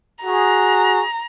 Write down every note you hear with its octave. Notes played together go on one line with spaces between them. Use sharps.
F#4 G#4 A#5